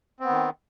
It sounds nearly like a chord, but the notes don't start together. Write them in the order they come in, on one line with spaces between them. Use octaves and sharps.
C4 B3 D#3